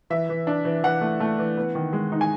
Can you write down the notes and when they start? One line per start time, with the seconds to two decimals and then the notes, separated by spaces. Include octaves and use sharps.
0.10 E3 E5
0.29 E3
0.47 D4
0.65 E3
0.83 E3 F#5
1.01 A3
1.20 A3
1.38 E3
1.57 B3
1.75 D#3
1.93 G#3
2.12 D#4
2.21 G#5